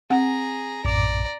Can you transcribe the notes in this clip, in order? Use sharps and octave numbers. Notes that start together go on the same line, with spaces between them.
C4 G#4 F#5 A#5
A#1 F#2 A2 D5 A#5 D6